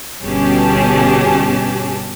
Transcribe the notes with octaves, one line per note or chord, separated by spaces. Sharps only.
G1 B2 C#4 G4 G#4 A5